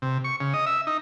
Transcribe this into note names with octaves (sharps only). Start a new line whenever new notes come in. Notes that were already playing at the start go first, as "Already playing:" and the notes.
C3
C#6
C#3
D#5
E5
D#4